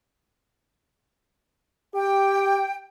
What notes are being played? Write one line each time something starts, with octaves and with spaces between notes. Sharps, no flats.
G4 G5